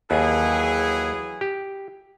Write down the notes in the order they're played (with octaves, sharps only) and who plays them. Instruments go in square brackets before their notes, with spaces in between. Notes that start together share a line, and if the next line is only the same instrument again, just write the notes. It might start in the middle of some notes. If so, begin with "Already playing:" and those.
[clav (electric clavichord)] D#2 [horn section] E3 F#3 G#4
[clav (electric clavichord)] G4